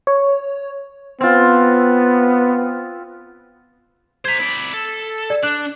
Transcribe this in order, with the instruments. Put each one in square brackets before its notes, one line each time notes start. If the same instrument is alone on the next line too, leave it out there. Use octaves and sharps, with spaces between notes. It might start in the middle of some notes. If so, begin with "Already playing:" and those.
[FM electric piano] C#5
[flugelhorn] B3 [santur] C4 F4
[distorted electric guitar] C5 A#5 [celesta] G#6 B6
[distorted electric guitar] E4 D5
A4
[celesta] D5
[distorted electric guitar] D4 [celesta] F#6